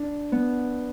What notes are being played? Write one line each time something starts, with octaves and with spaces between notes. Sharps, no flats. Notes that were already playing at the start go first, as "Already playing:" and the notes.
Already playing: D4
B3